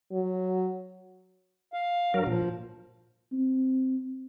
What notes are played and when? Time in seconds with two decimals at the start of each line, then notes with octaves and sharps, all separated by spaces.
0.12 F#3
1.73 F5
2.14 G2 F#3 A#4
2.26 A#2 F3
3.32 C4